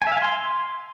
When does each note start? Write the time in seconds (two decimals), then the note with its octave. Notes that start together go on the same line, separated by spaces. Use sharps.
0.02 G#5
0.07 E5
0.12 F5
0.17 G#5
0.22 C6